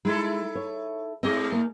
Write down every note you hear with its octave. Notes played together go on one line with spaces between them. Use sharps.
G#3 D#4 E4 A4
C#5
G#2 A3 C4 G#4 D#5
A#3